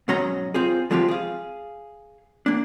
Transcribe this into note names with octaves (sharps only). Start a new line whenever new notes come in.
B1 G#2 F#3 C#4 D#5 A#5
C4 F4 G#4
F3 G#3 C4 F4 G4
G#4 F5
A#3 D4